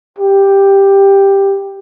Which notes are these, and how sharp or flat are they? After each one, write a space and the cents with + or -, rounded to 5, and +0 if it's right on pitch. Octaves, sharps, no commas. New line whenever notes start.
G4 +5